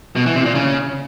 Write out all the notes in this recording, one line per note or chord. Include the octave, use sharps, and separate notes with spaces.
B2
E3
C3
A#2
C#3